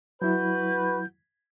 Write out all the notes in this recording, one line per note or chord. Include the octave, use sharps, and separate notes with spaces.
F#3 E4 F#4 B4 G6